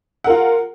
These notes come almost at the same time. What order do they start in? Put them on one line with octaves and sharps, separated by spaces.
F#5 A#4 F4